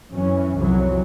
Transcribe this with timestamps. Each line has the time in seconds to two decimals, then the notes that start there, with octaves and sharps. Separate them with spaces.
0.15 F#2 E3 C#4
0.56 C2 F2 C3 E3 F#3